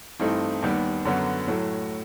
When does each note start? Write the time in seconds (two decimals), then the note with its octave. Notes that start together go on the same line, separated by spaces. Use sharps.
0.19 G2 E3 A3 C4 D#4
0.62 D#2 D#3 G3 B3
1.05 F#2 D3 F#3 B3
1.47 A2 F#3 A3